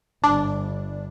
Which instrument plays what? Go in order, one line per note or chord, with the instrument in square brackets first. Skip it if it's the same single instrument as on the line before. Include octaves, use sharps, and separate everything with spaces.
[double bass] G1 [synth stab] D4